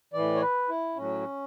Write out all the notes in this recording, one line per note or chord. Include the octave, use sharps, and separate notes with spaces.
A2 E3 D5
C#5
B4
E4
A2 F#3 C#4